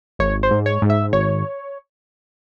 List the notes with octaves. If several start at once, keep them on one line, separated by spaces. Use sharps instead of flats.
G#1 C#5
C5
G#2
C#5
G#2
E5
G#1 C#5